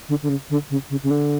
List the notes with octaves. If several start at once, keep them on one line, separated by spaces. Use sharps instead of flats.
D3
D3
C#3
D3
C#3
C#3
C#3
D3